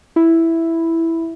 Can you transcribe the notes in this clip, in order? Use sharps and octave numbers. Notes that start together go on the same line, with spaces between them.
E4